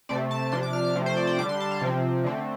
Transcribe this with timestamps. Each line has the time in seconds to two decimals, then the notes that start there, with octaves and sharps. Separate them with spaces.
0.09 C3 A3 C4 D5
0.31 A5
0.52 C3 F3 D4 C6
0.63 D6
0.73 F6
0.85 D6
0.95 C3 F3 A3 C4
1.06 C5
1.17 D5
1.27 G5
1.38 D3 G3 D4 D6
1.49 C6
1.60 A5
1.71 F5
1.81 C3 F3 C4
2.24 D3 A3 C4